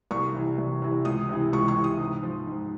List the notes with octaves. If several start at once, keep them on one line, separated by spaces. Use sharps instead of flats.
C2 C#6
C3 E3
C2
C3 E3
C#2 D#6
C3 E3
C#2 C#6
C#6
C3 E3
D#6
G#2
F3
G#2